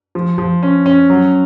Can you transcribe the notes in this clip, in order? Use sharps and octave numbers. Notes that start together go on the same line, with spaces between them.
F3
F3
C#4
C#4
F#3